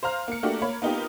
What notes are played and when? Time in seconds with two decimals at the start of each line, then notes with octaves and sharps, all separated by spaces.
0.03 C5 F5 A#5 F6
0.28 A#3 C#7
0.43 A3 A#3 D4 F#4 G4
0.62 A#3 C#5 B5
0.82 A#3 B3 D#4 F4 G4